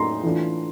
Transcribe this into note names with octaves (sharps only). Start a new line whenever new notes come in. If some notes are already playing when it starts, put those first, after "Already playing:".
Already playing: A2 F#3 A#3 D#4 A#5 C6
E3 A3 D4 F4